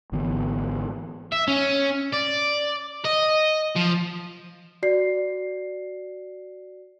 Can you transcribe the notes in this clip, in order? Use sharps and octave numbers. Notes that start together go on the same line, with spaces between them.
G#1 D3 E3 B3
E5
C#4
D5
D#5
F3
F#4 D5 C7